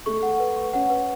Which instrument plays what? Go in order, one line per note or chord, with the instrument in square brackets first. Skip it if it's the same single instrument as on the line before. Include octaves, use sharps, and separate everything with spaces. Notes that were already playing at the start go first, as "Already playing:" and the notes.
[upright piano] A3 [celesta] C#6
[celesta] F#5
B4
C#6
[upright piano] C#4 [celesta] F#5
[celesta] B4